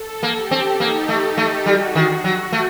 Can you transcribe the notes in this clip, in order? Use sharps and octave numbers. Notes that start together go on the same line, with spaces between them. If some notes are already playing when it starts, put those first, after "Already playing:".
Already playing: A4
A#3
G4
C4
A#3 D#4
A3
A3
G3 F#4
D#3
F#3
A3